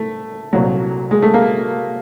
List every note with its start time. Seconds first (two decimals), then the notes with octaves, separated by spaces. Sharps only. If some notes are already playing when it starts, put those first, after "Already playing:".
Already playing: A3
0.53 C2 A#2 F#3
1.11 G#3
1.22 A3
1.34 A#3